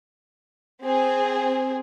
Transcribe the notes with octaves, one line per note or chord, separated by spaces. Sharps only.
C4 G#4